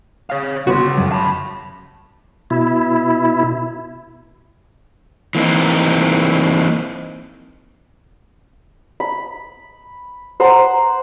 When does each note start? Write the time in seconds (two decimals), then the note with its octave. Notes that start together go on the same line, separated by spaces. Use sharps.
0.30 C#5 F5
0.67 G1 C#3 B3 F#4 C6
0.98 F#2 F#3
1.12 A5 B5
2.50 B2 E4
5.35 E3 A#3 C4 D#4
9.00 B5
10.40 C5 F#5 A#5